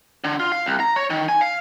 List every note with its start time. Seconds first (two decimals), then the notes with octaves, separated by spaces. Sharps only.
0.24 D3
0.40 F4
0.52 F5
0.66 C2
0.80 A#5
0.96 C#5
1.10 D#3
1.29 G#5
1.41 F5